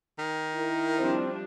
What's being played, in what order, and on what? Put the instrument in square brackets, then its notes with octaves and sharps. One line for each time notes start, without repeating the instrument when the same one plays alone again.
[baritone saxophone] D#3
[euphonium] E4 [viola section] A#4
[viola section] F3 G3 D4 [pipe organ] C4